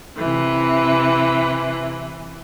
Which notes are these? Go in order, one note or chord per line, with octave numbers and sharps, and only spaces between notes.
C3 E3